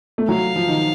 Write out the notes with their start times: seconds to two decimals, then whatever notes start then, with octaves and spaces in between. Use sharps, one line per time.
0.18 A3
0.29 F#3 F5
0.56 F3
0.68 D#3